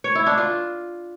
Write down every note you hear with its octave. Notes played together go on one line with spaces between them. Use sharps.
C#5
E4
D4
F4